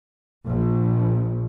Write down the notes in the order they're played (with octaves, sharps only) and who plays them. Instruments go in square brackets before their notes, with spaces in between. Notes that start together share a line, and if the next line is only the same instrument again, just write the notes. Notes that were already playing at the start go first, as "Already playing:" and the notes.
[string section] A#1